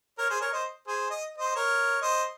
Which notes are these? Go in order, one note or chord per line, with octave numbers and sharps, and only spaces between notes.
A#4 C#5
G#4 C5
A#4 C#5
C5 D#5
G#4 C5
D#5
C5 D#5
A#4 C#5
C5 D#5